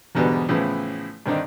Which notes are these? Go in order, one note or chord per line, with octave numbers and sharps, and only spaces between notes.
E2 G#2 B2 D3 G3 B3
A2 C#3 E3 F3 B3 E4
G2 D3 D#3 C4 D4 D#4